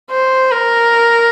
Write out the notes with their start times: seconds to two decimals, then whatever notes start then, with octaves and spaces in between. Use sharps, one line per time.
0.11 C5
0.51 A#4